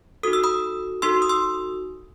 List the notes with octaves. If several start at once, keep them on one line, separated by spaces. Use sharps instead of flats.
D#4 F#4 A4 D#6
E6
B5 D#6
D#4 F#4 A4 C6 E6
D#6
C6 E6